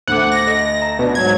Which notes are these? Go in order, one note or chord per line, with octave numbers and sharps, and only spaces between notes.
D2 A3 C5 F#5 D6
A#6
A4 D#5
A#5
B2 D4
G#2 F#3 G#6